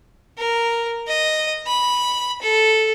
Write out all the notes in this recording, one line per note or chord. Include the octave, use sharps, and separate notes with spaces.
A#4
D#5
B5
A4